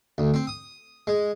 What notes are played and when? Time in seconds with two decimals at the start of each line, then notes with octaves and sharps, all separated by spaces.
0.18 D2
0.34 C4
0.47 D#6
1.07 G#3